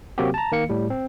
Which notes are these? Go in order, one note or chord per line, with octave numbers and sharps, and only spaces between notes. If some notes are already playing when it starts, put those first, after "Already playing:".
C3 F#3 A#3 C4 F#4 G4
A5 A#5
D#3 A#3 F5 C#7
A2 G3
C4